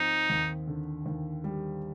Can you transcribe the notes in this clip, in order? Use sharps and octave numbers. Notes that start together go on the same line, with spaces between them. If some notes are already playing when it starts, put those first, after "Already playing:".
Already playing: G#2 F3 C4 D#4
D#2
D3
D#2
G3